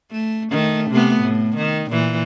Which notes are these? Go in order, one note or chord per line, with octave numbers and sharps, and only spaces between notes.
A3
D#3 A3
C3 A3 B3
A2
D#3
A#2 E3